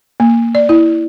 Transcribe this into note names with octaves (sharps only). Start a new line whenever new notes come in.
A#3
D5
E4